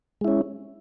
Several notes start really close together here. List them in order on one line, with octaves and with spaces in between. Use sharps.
G#3 E4 C#4